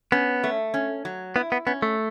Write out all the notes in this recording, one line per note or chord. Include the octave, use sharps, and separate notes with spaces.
B3 C#4
A3
C#4
F#3
B3 E4
B3
B3 C#4
A3